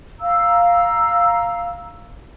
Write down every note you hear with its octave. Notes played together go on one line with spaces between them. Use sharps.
F5 A#5 E6